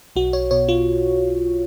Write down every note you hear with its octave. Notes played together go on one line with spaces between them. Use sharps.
B1 F#4
C#5
B2 C#5
F4